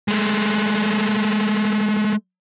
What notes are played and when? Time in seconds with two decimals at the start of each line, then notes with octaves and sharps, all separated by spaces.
0.08 G#3 A3